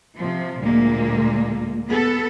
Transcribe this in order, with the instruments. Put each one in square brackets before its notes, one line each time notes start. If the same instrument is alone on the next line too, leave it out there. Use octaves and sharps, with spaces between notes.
[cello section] C3 F3
D2 A#2 G#3 A#3
B3 A4